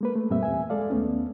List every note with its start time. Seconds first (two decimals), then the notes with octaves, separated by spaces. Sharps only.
0.01 G#3 A#3 B4
0.16 A3
0.30 F#2 A#2 G3 A#3 C4 E5
0.43 E2 E5 G#5
0.70 G#3 A4 D5 F5
0.90 D#2 A3 B3 C#4